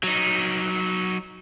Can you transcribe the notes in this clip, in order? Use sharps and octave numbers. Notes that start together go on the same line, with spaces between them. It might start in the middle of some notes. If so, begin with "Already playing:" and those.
F#3 D#4